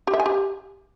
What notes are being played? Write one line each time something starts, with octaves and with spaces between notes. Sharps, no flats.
G4
E5
G#5
G4